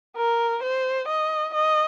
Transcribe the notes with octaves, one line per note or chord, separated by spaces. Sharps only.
A#4
C5
D#5
D#5